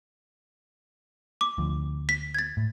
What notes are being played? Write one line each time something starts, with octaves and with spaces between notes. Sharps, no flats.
D6
D2 F3
B6
G#6 A6
A2